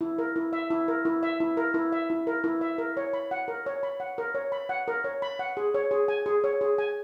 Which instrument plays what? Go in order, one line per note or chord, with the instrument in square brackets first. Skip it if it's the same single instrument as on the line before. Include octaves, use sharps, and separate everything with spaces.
[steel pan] E4
A#4
E4
E5
E4
A#4
E4
E5
E4
A#4
E4
E5
E4
A#4
E4
E5
A#4
C#5
B5
F#5
A#4
C#5
B5
F#5
A#4
C#5
B5
F#5
A#4
C#5
B5
F#5
G#4
C#5
G#4
G#5
G#4
C#5
G#4
G#5